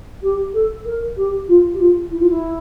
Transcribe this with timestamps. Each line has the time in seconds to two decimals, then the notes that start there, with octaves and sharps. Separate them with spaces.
0.23 G4
0.54 A4
0.85 A#4
1.17 G4
1.48 F4
1.74 G4
1.80 F4
2.11 E4
2.20 F4
2.29 E4